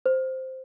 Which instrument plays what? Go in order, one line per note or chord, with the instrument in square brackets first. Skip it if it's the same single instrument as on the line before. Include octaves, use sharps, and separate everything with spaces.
[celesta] C5